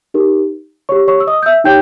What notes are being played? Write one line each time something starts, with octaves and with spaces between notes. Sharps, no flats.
D#4 G4 A#4
C#5 C#6
G4
C#5 C#6
E6
D#5 D#6
G6
E5 E6
D#4 G4 C#5 G5 G6